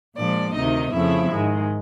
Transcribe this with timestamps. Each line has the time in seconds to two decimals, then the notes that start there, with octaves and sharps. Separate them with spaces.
0.16 A#2 F3 G#3 D4 D5
0.54 D2 C3 D#3 D#4 D#5
0.92 F2 C#3 F3 A3 E4 E5
1.29 G#2 D#3 G#3